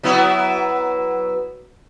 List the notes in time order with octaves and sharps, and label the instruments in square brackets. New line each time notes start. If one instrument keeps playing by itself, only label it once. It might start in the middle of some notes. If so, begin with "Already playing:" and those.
[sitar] F#3 B3 E4